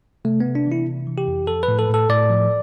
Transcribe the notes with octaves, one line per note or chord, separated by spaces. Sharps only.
C3 A3
C3 B3
D4
E3
E4
C3
E3
G4
F2
F3 A4
B4
A2
A4
A2 A4
A2 D5
F3